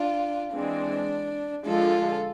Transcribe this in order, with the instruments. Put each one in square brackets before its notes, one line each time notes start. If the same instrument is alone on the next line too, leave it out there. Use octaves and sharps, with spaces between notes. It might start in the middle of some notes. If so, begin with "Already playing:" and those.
Already playing: [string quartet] D4 F4
[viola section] E3 G#3 C4 [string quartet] D4
[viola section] D3 F3 G#3 [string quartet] F4 A4